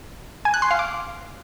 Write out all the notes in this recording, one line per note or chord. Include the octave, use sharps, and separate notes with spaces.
G#5
F#6
C6
F5
D6